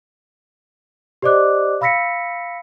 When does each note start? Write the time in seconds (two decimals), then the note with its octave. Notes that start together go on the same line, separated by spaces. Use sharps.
1.22 G4 C5 D5 D#5 D6 F#6
1.81 F5 B5 E6 A#6 B6 C#7